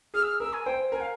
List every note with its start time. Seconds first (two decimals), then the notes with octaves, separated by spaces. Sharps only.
0.14 G#4 F6
0.23 E6
0.27 F6
0.40 A#4 E6
0.53 G#5
0.66 C5 G5
0.92 A#4 G#5
1.01 F5